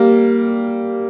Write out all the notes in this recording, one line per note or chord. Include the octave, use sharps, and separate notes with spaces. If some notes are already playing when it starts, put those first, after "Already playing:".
Already playing: G3 A#3